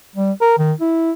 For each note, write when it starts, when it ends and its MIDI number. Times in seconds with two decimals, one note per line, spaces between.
0.16 0.32 55
0.41 0.57 70
0.58 0.73 51
0.81 1.12 64